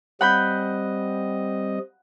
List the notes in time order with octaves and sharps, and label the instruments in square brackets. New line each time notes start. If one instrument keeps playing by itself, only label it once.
[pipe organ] G3 C4 D#5 [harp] F#5 B5 G6